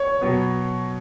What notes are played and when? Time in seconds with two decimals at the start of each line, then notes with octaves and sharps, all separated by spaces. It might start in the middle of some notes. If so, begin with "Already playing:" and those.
Already playing: C#5
0.21 B2 F#3 B3